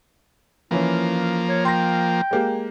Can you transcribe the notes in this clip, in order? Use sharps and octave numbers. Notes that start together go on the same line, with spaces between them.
E3 F3 A#3 C#4 E4
C#5
G5 C6 A#6
G#3 A#3 G4